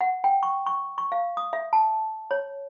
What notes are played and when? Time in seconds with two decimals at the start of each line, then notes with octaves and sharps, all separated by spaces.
0.01 F#5
0.24 G5
0.43 C#6
0.66 C#6
0.98 C#6
1.12 F5
1.37 D#6
1.53 E5
1.73 A5
2.31 C#5